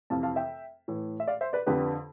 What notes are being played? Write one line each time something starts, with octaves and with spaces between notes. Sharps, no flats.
F2 C3 E3 F5 A5
F5 A5
E5 G5
A2 E3
E5
D5 F5
C5 E5
B4 D5
F2 D3 G4 B4